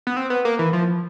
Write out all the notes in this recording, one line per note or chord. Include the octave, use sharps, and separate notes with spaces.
B3
C4
B3
A#3
E3
F3